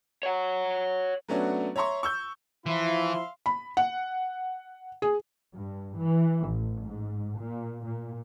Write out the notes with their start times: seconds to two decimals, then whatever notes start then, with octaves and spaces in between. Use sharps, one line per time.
0.23 C#5 F#5
1.28 F#3 A3 B3 C#4 D4 F#4
1.76 C#5 E5 A#5 C6 C#6
2.03 C#6 E6 G6
2.66 E3 F3 E4 E5 F5 C6
3.46 B5
3.77 F#5
5.02 G#4
5.54 G2
5.97 E3
6.46 A1
6.83 G#2
7.37 A#2
7.85 A#2